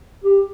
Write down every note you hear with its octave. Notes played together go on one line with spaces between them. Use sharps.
G4